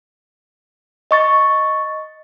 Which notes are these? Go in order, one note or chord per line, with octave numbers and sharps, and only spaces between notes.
D#5 C#6 A6